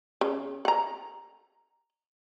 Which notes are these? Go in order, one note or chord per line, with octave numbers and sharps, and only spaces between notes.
C#3
F#5 A#5